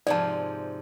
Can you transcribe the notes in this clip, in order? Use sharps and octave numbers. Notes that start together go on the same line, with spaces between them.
G#2 C3 F3 D5 A5